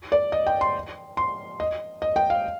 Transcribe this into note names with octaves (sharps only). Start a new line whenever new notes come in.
D5
D#5
G5
C6
C6
D#5
D#5
G5
F5